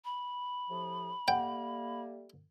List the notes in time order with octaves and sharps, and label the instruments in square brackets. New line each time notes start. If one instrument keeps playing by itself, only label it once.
[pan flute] B5
[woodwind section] A2 C3 F3
[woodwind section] G3 A3 A#3 [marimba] F#5 [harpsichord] G5